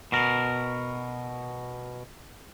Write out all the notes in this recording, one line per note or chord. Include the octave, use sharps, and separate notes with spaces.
B2 A#4